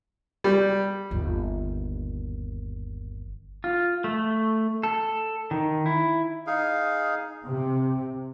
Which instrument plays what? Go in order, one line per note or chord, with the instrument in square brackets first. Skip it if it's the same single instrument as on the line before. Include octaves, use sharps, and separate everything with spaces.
[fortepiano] G3
[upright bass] G1 D#2
[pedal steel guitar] F4
A3
A4
D#3
E4
[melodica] D#4 G#4 F5
[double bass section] C3